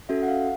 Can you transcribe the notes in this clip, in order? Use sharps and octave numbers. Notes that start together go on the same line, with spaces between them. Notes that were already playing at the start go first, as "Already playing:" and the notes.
C#4 F#4 A4 E5
F#5
F5